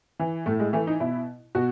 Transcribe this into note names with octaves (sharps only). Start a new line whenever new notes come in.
E3
A2 A3
G#3
E3 A3
D#4
B2 E4
B2 F#4